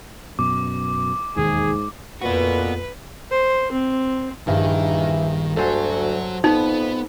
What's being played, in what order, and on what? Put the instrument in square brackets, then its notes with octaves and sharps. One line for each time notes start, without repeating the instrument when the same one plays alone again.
[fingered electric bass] F#2 B2 [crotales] D6
[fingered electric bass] E1 D#2 D#3 [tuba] G#2 [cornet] G#4
[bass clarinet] F2 [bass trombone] A#2 [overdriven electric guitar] B3 F#4 [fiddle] B4
[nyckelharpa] C5
C4
[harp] A#1 G2 [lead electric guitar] D#3 [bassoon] E3
[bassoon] D2 [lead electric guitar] F#3 F#4 [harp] A4 C5 G#5
[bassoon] F2 [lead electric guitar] B3 [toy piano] D#4